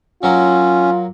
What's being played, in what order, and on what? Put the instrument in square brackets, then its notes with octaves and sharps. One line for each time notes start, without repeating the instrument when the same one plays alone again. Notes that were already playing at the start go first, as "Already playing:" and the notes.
[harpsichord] F#3 A#3 [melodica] C#4 [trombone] F4